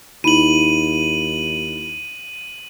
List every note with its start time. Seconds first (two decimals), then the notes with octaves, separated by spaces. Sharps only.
0.24 D#2 D#4 E4 B5 D#7 F#7